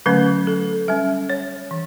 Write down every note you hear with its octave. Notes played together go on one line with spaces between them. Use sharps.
D3 F#3 A3 C#4 B4
A4
G3 C#4 E5
C#5
E3